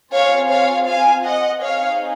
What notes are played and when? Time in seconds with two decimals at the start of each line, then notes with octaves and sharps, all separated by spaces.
0.13 C4 F4 G#4 C#5 F5
0.50 C#5 F5
0.87 F5 G#5
1.24 D#5 F#5
1.62 C4 D#4 G#4 C#5 F5